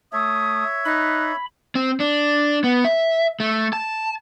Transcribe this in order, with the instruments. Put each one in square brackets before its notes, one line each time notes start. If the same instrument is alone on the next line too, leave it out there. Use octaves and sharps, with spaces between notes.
[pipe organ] A3 [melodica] C#5 E5 [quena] D#6
[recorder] D#4 [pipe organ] B5 [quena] F#6
[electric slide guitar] C4
D4
B3
E5
A3
A5